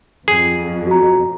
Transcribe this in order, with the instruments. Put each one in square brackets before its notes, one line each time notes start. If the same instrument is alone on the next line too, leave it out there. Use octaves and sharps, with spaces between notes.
[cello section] F2 [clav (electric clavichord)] G#4
[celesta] F#4 A#5